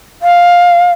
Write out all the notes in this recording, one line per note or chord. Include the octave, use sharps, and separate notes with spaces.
F5